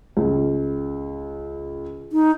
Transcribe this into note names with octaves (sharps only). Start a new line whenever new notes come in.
C#2
D#4